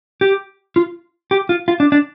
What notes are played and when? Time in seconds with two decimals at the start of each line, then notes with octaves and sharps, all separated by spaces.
0.21 G4
0.76 F4
1.31 G4
1.49 F4
1.68 F4
1.80 D4
1.92 D4